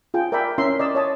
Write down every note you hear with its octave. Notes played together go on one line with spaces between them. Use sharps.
F4 G#4 G5
A#4 D5 E5 G5 B5
C#4 E4 A#4 E5 C6
D5 D#5 E6
C#5 D#5 A5